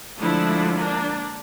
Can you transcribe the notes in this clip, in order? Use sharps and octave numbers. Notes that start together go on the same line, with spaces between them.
D3 F3 G#3 A3 D4 E4
A#3 D4